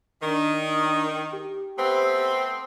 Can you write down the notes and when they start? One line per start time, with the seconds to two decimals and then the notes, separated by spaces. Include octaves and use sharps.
0.22 D#3 D4
1.33 G4
1.78 A3 B3 C4